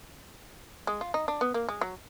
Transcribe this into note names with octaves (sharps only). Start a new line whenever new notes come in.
G#3
F4
D#4
D4
B3
A#3
G#3
F#3